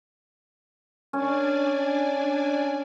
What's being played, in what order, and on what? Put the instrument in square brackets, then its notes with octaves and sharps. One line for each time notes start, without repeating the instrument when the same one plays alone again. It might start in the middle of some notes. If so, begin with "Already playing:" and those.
[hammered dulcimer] C#4 [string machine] D4 D5 G#5